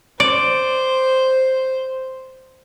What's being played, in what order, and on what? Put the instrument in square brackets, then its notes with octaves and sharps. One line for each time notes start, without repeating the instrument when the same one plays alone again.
[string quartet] C5 [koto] D5